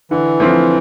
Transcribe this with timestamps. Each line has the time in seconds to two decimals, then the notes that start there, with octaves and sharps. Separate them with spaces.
0.11 D3 E3
0.40 F3 A3 C4 F4